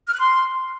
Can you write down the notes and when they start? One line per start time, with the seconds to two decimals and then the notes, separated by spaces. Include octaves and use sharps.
0.08 F6
0.14 F#6
0.20 C6